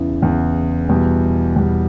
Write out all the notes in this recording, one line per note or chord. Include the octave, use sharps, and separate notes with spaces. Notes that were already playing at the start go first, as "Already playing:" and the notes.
Already playing: E2 C#3 E3
E2 C#3 E3
E2 B2 G3
E2 B2 G3